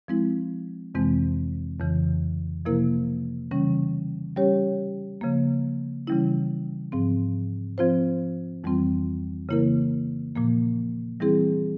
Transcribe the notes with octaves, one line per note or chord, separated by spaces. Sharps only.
F3 G#3 C4 E4
F2 C3 E3 G#3 C4
F2 C#3 E3
C3 F3 A#3 E4 A#4
C#3 E3 G3 C#4
G3 C#4 G4 C#5
C#3 F3 A#3
C#3 E3 G3 C#4 E4
G#2 F3 C4
F3 C4 F4 C5
F2 E3 G3 C4 F4
C#3 E3 A#3 E4 A#4
A#2 F3 A#3
E3 G3 C4 E4 G#4